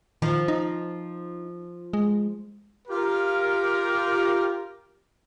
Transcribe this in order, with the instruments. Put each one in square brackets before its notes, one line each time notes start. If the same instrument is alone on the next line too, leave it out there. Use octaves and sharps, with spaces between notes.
[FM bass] D#3 [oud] F3
[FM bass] D#4
G#3
[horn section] F4 G4 A#4